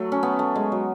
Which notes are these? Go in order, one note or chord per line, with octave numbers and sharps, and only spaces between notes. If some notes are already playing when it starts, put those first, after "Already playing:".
Already playing: F#3 A3
C#4
B3
A3
G#3
F#3